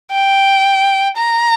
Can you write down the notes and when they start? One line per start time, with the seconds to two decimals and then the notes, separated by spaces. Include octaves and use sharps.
0.12 G5
1.17 A#5